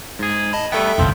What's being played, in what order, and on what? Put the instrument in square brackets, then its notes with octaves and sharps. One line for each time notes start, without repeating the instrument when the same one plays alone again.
[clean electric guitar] G#2 G#4
[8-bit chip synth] D#5 A5 B5
[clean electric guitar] G3 A3 B3 [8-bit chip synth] A4 E5 G5
[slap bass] G1 C2 F2 [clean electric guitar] A2 F3 C4